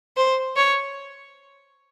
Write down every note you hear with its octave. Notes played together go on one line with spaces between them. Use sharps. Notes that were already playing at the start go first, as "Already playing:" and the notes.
C5
C#5